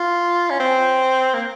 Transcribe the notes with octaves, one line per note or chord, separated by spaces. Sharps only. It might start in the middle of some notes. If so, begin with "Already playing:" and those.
Already playing: F4
C#4
C4
A#3